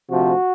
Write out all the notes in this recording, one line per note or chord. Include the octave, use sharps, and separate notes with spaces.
D2 C3 F3 F#4